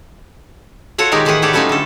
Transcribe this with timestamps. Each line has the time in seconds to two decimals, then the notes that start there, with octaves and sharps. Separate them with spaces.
0.98 F4 F#4 A4 C#5 F#5
1.12 A#2 D#3 G#3 D#4 G4 A#4
1.25 A2 D#3 E3 G#4 B4 F#5
1.42 F#4 G4 A4 C#5 D5
1.53 F#3 G3 A3 C#4 D#4 F4
1.69 D3 A4